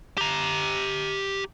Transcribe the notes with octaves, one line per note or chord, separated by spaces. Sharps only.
G4 A#5